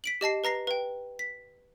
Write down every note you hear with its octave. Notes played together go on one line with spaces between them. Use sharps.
B6 D7 F#7
G4 D#5 A5 C7
B4 A#5 A#6 C7
B4 G5
B6